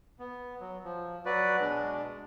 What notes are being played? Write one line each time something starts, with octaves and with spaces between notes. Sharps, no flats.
B3
F#3
F3
F#3 F#4 B4 D5
B2 G#3 D4